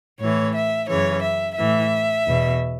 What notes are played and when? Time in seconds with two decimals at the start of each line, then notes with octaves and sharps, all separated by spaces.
0.20 A2 E3 C#5
0.55 E5
0.89 F#2 C#3 E3 C#5
1.23 E5
1.58 A2 E3 E5
2.27 E2 B2